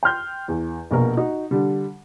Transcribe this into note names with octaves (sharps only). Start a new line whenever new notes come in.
G5 C6 F6 G6
E2
A#1 B2 A#4
D#4 F#4
D3 G3